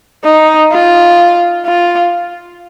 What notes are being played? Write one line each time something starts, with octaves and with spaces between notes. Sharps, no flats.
D#4
F4
F4